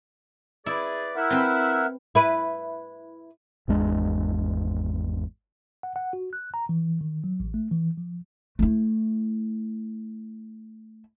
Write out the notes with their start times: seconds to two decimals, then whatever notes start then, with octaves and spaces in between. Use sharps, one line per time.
0.66 E4 G#4 B4 D5
1.16 E4 A#4 E5 F#5
1.30 C4 B4 G5
2.15 E4 B4
3.68 G#1 E2 G#3 D4
5.83 F#5
5.96 F#5
6.13 F#4
6.33 F#6
6.54 A#5
6.69 E3
7.01 D#3
7.24 F#3
7.40 A1
7.54 A3
7.71 E3
7.97 F3
8.59 A3 E4